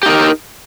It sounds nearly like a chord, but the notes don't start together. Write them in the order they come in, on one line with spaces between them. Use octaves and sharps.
G4 D#4 A#4